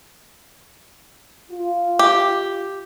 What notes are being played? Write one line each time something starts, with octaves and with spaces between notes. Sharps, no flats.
F4
G4